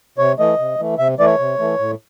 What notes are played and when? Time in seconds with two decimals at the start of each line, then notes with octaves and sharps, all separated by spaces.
0.18 C3 C#5
0.39 E3 A3 D#5
0.59 C3
0.79 E3 A3
0.98 C3 E5
1.19 E3 A3 D5
1.26 C#5
1.39 C3
1.59 E3 A3
1.79 A2